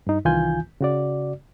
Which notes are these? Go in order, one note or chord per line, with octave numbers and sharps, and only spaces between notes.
G2 D#4
C2 D#3 E3 F4 G#5 G6
C#3 F#4 D5